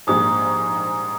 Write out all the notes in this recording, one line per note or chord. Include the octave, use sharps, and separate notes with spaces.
A#1 G#2 G3 A#3 D#6